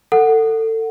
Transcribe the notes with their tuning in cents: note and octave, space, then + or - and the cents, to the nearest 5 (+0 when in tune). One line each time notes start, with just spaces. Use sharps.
A4 +25 F#5 +0